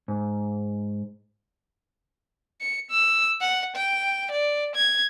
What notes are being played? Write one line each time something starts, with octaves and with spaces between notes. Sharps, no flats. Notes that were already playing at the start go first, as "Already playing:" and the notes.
G#2
C#7
E6
F#5
G5
D5
G#6